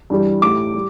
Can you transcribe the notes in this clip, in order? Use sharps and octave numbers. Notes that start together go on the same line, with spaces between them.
G2 E3 G3
A2 G3 D6
G3